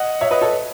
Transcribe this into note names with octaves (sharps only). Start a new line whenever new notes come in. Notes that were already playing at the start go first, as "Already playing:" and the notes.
Already playing: D#5 F#5
C#5 E5
B4 D#5
A4 C#5